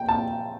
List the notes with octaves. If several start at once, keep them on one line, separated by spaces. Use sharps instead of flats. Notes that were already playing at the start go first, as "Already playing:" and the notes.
Already playing: G5
A5